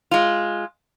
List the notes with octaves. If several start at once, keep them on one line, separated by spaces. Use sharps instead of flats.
G#3 F4